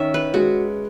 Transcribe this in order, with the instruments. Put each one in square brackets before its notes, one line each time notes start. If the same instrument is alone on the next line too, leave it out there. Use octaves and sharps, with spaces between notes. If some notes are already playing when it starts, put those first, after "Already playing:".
Already playing: [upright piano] D#3 C#4 [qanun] E5
[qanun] B4
[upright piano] G#3 [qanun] F#4